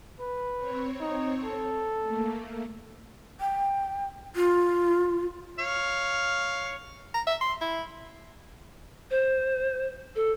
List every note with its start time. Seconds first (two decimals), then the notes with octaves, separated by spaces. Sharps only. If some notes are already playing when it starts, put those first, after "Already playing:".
0.20 B4
0.57 C4 C#5
1.01 D#4
1.44 A4
2.02 A3 A#3
3.41 G5
4.36 F4
5.59 C#5 F5
7.14 A#5
7.27 E5
7.41 C6
7.61 E4
9.11 C5
10.15 A4